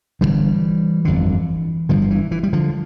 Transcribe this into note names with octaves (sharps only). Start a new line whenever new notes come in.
G1 F2 D3 E3 G3
G1 F2 D3
G1 G2 D3 F3
F3
E3
E3
G3
D3 F3